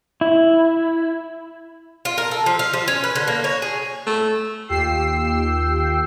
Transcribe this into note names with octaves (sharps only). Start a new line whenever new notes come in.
E4
F4
A#4
A4
F3
F5
F3
C#4
B4
D3
A#3
C#5
G#4
A3
D#2 F4 G4 G5 E6 C7